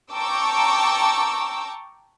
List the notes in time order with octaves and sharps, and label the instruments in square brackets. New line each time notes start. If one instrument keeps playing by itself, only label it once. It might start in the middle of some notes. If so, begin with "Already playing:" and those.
[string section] G5 A5 A#5 C#6 D6 E6